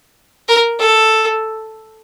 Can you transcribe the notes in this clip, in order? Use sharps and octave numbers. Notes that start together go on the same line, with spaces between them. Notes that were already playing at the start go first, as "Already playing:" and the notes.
A#4
A4